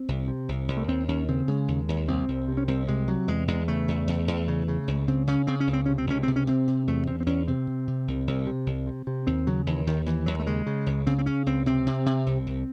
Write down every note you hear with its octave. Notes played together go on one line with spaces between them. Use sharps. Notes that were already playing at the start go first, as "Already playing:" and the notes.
Already playing: C4
C2
C3
C2
C2
A3
D#2 C4
D#2 C#4
C#3 C4
C#3 G#3
D#2
D#2
C2 C4
C2
C3
C#4
C2 C4
C3 G#3
C3 F#3
E2 G#3
E2 G#3
C#3 A3
E2
E2
E2
C#3
C#3
C#2
C#3 C4
C#3 C#4
C#3 C4
C#4
C#2
C4
C3 C#4
C4
C#2 C#4
C3 C4
C#4
C3 C4
C3
E2 A3
E2 C4
C4
E2 C#4
C3 C4
C3
C3
C2
C2
C3
C2
C3
C3
D#2 C4
C#3 F#3
D#2 E3
D#2 D#3
D#2 E3
D#2 F#3
A3
C#3 G#3
C#3
C#2
C#3 C4
C4
C#3 C#4
C#2 C4
C3 C4
C3
C3
C2
C2